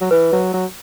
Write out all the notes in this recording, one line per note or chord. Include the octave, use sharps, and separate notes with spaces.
F#3
E3 B4
F#3
F#3